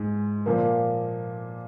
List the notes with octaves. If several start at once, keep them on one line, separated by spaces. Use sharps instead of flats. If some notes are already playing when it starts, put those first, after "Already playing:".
Already playing: G#2 G#3
A#2 F3 A#3